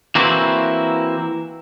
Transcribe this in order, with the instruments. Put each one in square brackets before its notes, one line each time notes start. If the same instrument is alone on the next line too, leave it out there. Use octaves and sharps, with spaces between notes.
[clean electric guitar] E3 A#3 C4 E4 F#4